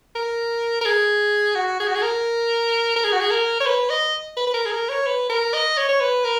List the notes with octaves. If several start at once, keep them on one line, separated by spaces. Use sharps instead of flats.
A#4
A#4
G#4
F#4
G#4
F#4
G#4
A#4
A#4
G#4
F#4
G#4
A#4
C#5
B4
D#5
B4
B4
A#4
G#4
A#4
C#5
B4
A#4
D#5
C#5
C#5
B4
A#4